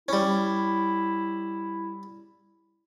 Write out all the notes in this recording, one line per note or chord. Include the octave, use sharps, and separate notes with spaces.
G3 C#4 E4